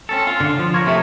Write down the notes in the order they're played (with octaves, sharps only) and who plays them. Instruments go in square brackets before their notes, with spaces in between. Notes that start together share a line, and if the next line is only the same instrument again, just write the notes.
[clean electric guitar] C4 C#4 A4
F4
[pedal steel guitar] D3
F3
F3 A#4 C#5
[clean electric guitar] C3 A3